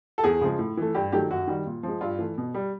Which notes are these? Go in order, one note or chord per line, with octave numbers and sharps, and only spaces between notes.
A4
E2 G#4
C#3 F3 G#3
A2
E3 A3
G2 G4
D#3 F#3 A3 G4
F#2 F#4
D#3 G3
A#2
F3 G#3
G2 F4
E3 A3
B2
G3